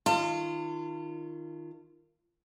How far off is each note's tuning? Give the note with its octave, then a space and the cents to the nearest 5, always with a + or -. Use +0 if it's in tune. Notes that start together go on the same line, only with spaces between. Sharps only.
D#3 -5 F4 -25 A5 +40